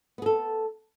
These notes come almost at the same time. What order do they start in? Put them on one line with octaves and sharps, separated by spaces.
B3 G#4 A4